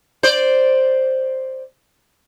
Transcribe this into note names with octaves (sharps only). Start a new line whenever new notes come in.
C5 D5